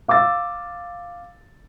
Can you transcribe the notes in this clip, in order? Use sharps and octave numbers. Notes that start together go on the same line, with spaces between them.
F5 D6 E6 A6